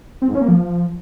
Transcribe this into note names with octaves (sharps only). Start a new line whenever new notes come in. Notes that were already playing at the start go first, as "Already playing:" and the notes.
C4
G#2
C#4
A#3
F3